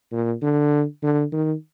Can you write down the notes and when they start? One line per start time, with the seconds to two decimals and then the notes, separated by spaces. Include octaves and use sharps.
0.12 A#2
0.42 D3
1.03 D3
1.32 D#3